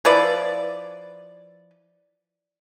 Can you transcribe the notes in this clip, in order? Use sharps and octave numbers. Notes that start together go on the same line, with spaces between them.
F3 E4 B4 D5